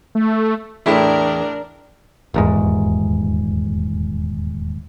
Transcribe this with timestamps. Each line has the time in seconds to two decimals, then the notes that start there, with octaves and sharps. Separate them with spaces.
0.15 A3
0.86 E2 A2 A3 D4 E4 G#4 A#4 G5
2.34 D#1 E2 G#2